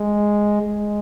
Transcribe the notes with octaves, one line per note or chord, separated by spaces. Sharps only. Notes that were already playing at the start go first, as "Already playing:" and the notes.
Already playing: G#3
G#3